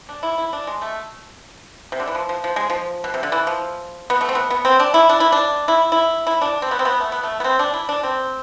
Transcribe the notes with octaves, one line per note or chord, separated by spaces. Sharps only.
D4
E4
E4
D4
G#3
A3
C3
D3
E3
F3
F3
F3
G#3
F3
B2
C3
D3
E3
F3
B3
A3
C4
B3
B3
C4
D4
E4
D4
E4
D4
E4
E4
E4
D4
C4
B3
C4
B3
A3
B3
A3
B3
C4
D4
E4
D4
C4